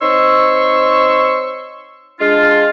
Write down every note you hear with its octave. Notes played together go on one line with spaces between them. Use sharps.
C4 D#4 C#5 C6 C#6 E6
G#3 D4 F4